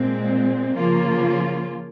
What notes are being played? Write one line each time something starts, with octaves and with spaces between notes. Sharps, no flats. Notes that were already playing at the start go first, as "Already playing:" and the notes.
Already playing: A#2 G#3 C4
C#3 F3 A#3 F4